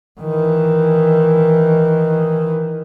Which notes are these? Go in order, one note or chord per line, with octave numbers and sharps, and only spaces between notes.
D#3 E3